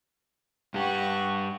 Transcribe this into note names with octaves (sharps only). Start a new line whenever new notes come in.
G2 G4 F#5 C#6